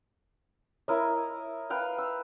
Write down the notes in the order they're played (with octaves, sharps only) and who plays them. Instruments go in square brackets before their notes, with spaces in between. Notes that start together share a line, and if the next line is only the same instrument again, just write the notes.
[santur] E4 A#4 D#5 [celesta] C#5
[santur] B4 F5 G5
E6